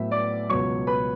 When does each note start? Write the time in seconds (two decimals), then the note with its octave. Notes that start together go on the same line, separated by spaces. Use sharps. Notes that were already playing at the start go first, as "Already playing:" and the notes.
Already playing: A2 F#3 B3 E5
0.11 D5 D6
0.49 C#2 B2 F#3 C#5 C#6
0.87 B4 B5